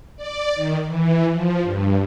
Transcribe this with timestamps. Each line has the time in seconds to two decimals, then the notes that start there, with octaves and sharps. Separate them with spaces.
0.16 D5
0.55 D#3
0.86 E3
1.31 F3
1.63 G2